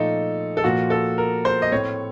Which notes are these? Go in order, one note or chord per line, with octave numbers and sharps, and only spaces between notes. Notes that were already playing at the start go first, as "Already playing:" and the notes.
Already playing: A#2 F3 A3 D#4 A4
A4
A#2 F3 A#3 F#4
A4
A#4
C5
D#5
A2 A3 C4 C#5